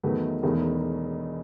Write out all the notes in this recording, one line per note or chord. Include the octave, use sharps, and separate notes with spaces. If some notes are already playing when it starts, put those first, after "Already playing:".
E2 D#3 F#3 A3 B4
E1 E2 D#3 A3